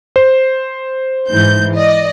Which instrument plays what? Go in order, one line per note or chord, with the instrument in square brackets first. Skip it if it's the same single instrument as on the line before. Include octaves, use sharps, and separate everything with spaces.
[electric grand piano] C5
[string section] G#2 E3 G6
D5 D#5